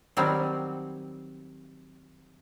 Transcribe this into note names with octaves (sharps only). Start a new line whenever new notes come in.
D#3 F#3 G3 C4